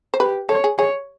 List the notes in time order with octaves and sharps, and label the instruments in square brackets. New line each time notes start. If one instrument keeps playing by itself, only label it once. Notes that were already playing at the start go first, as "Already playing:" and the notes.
[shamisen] C5
[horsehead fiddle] G4 [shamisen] B4
[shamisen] A4 [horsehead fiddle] C#5
[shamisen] G#4
[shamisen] G#4 [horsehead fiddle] C#5